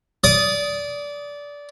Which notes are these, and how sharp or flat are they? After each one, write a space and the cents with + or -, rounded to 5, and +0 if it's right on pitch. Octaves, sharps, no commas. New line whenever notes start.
D5 -20 D#6 +0